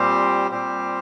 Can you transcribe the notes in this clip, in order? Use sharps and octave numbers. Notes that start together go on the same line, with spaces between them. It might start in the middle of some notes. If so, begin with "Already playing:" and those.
Already playing: A#2 G3 C4 G4 C5
A#2 G3 C4 G4 C5